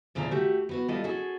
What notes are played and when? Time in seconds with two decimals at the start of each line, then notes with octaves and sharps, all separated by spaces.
0.15 A#2 C#3 F3 A3 D4 A#5
0.31 A3 F#4 G4
0.69 B3 F#4 B4
0.88 G3 A3 E4 F4 A4 D#5
1.04 C#4 F#4 G#4 A4